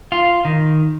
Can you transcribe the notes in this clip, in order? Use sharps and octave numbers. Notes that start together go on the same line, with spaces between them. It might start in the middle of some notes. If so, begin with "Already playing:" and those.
F4
D#3